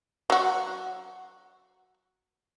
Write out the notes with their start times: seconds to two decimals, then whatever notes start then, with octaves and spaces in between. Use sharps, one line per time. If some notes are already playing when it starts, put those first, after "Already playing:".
0.30 F#3 F#4